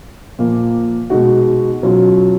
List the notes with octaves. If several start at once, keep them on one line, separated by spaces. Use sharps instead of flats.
A#2 F3 A#3
B2 G#3 D#4 F#4
B2 F#3 C#4 F4